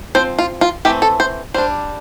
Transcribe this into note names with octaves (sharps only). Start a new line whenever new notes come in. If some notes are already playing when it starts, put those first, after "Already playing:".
F3 C4 C5
F4
F4
E3 A3 C4 G4
A4
C5
G3 D4 C5